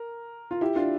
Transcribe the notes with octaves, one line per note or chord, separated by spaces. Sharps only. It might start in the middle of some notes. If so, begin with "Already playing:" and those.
Already playing: A#4
F4
E4 G4
D4 F4